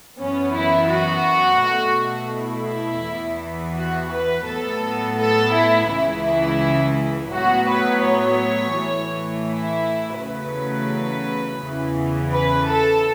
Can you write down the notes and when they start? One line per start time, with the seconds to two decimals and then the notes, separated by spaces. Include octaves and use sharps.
0.19 F#2 E3 B3 C#4
0.55 E4
0.90 F#4
1.62 B2 A3
2.34 E4
3.04 E2 E3 B3
3.76 F#4
4.11 B4
4.47 A2 F#3 B3 A4
5.19 A4
5.54 E4
5.90 C#2 C#3 E3 E4
7.33 A2 F#3 B3 F#4
7.68 B4
8.05 C#5
8.76 A2 E3 A3
9.48 E4
10.18 E2 C#3 F#3 A3 B4
11.61 E2 C#3 E3
12.32 B4
12.69 A4